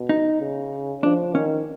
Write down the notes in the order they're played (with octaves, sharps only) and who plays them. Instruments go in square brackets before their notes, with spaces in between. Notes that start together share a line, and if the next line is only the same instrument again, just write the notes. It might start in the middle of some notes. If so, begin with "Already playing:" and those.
Already playing: [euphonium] B2
[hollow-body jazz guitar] D#4
[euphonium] C#3
[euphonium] F3 [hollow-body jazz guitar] D4
[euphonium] D#3 [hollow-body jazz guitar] C#4